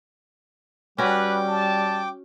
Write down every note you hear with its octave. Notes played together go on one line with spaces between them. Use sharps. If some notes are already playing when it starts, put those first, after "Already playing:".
G3 C#4 F#4 B4 G5 D6
A5